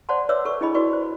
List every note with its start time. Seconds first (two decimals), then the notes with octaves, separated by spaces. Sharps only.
0.09 C5 D5 F#5 A5 C6
0.29 B4 C#5 D5 E5 D6 E6
0.45 A4 B4 C#6
0.61 D4 E4 G#4 D#5 B5
0.74 D4 E4 F#4 B4 D5 C#6
0.93 C5